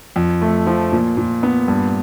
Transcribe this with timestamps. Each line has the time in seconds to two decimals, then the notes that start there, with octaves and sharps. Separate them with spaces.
0.16 F2
0.42 A3
0.67 F3
0.92 A#2
1.17 A#2
1.43 B3
1.68 G2